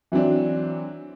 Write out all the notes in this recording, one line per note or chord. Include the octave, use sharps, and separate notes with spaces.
E3 F#3 C4 D4